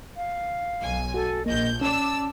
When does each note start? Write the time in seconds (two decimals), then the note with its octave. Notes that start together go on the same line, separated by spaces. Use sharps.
0.17 F5
0.81 B1 G#5
1.14 F#4 A4
1.46 A#1 A#3 D#5 G6
1.81 C#4 D5 A5 E6